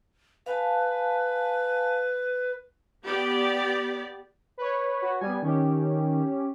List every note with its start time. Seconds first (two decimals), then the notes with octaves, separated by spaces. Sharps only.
0.46 B4 F5 G#5 A5
3.04 B3 G4 D5
4.58 B4 C#5
5.02 F#4
5.21 G3 B3 G#5
5.42 D#3 C#4 G4